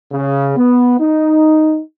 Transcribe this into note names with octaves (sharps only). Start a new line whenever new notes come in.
C#3
B3
D#4